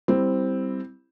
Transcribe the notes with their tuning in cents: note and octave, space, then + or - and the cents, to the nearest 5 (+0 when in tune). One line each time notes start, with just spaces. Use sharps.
G3 +0 C4 +0 E4 +0